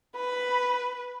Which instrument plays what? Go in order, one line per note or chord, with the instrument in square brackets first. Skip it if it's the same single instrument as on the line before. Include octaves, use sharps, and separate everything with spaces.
[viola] B4 [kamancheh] B5